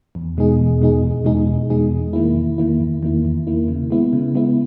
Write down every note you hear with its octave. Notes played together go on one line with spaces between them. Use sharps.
E2
B2 G#3 D#4 G#4
E2
B2 G#3 D#4 G#4
E2
B2 G#3 D#4 G#4
E2
B2 G#3 D#4 G#4
E2
D#3 A#3 E4
E2
D#3 A#3 E4
E2
D#3 A#3 E4
E2
D#3 A#3 E4
C#3
G#3 B3 E4
C#3
G#3 B3 E4